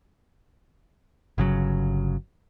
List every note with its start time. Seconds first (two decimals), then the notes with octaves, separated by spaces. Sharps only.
1.38 G1 C#3 F#3